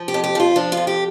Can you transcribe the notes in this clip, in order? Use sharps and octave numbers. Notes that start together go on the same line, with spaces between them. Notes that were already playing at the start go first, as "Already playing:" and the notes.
Already playing: F3
G4
F2
G4
F3 F4
F3 D4
F4
F2
G4